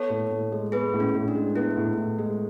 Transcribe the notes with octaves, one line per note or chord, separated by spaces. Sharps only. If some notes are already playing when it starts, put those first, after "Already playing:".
Already playing: B3 A4 C#5
A2
A2
G#3
B3 G#4 B4
A2
C#4
A2
D4
G#3
B3 E4
A2
A2
G#3